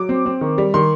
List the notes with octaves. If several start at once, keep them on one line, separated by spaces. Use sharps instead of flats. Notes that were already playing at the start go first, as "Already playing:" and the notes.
Already playing: F#3 D6
C4
C4
D#3
G3
D#3 C6